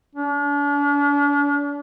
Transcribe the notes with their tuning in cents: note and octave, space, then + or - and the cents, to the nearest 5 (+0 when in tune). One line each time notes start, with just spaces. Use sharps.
D4 -40